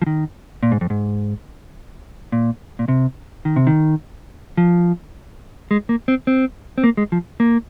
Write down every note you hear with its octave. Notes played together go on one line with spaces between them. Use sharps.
F3
D#3
A#2
G#2
F2
G#2
A#2
A#2
C3
D#3
C3
D#3
F3
G#3
A#3
C4
C4
C4
A#3
G#3
F3
A#3